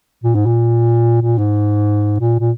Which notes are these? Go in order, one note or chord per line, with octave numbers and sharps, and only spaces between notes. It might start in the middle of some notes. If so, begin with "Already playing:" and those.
A#2
G#2
A#2
A#2
G#2
A#2
A#2